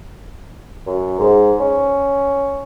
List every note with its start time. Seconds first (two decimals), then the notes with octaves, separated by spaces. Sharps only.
0.87 F#2
1.19 G#2
1.60 C#4